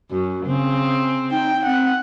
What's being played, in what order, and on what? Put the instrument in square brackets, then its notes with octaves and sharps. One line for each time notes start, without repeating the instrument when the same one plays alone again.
[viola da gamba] F#2 [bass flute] F#4
[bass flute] C#3 [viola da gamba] C4
[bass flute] D#4 [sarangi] G5
[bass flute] C4 [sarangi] F#5